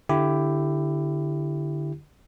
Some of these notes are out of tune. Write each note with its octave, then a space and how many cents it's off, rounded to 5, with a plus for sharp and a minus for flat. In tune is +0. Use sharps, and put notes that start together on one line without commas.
D3 +0 E4 +15 G4 +0